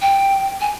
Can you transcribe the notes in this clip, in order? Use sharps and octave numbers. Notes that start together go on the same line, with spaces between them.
G5
G#5